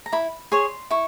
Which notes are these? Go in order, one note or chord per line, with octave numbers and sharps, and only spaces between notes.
A#5
E4 B5
G#4 C#5 C6
E4 C#6